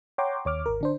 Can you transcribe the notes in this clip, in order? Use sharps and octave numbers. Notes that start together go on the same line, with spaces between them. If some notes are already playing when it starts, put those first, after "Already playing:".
C#5 F#5 G5 A#5 C6 D6
D#2 C#5 D6 F6
G#1 A#4
D3 D4 C5